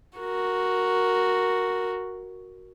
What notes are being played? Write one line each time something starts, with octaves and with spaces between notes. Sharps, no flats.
F#4 A#4